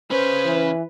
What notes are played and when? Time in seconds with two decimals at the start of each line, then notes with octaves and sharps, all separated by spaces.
0.11 C#3 C#4 B4 C5
0.45 E3